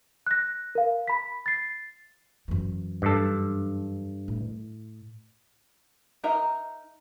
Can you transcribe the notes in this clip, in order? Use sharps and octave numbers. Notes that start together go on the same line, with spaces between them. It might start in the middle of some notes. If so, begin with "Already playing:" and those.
F#6 A#6
A#4 F5
B5 B6
A6 C7
F#2 E3
G2 A4
A2
D#4 A#4 D#5 E5 A#5